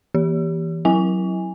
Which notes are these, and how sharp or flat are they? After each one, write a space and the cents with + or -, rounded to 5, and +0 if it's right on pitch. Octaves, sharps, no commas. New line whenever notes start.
E3 +0 G4 +0
F#3 +0 E4 +0 G#5 -15